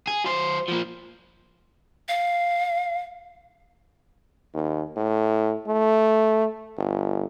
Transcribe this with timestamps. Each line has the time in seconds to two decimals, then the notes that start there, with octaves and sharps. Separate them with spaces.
0.08 G#4
0.25 F#3 C5
0.68 F3 A#3
2.08 F5
4.54 D#2
4.96 A2
5.67 A3
6.78 G1